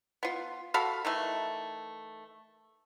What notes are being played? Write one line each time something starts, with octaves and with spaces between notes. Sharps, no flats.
B3 F4
F#4 A4 F5 B5
D#3 E3 A3